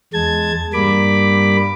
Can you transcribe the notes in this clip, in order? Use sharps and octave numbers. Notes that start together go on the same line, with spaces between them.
E2 G#3 A5 G#6
G2 G3 A#3 B5 D6